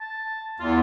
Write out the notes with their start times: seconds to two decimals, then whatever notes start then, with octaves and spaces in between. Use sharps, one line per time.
0.01 A5
0.60 E2 F4